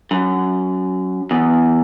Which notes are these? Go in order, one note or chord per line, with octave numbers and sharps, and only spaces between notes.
F#2
E2